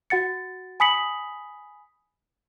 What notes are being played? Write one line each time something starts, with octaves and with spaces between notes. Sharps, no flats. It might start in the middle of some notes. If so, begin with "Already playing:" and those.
F#4 F#5 A6 C#7
G#5 B5 D#6 B6 C#7 F#7